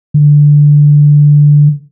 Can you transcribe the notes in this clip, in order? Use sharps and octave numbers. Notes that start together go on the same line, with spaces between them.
D3